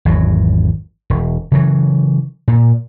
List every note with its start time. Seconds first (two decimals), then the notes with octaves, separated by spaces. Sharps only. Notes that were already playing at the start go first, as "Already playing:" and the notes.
0.05 G#1 E2 F#3
1.10 E1
1.52 C#3 E3 F#3
2.48 A#2